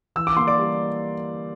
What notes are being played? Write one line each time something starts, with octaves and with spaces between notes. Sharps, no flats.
E3 E6
D6
A#3 C6
D5 D6
G3